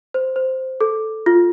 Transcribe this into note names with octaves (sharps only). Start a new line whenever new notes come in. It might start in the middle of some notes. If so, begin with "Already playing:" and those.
C5
C5
A4
F4